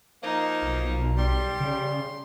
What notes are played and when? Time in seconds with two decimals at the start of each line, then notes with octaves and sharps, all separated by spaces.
0.23 F3 A#3 D#4
0.62 B1
1.17 G3 C6
1.60 C#3